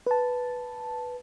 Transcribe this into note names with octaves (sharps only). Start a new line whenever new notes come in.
B4 A5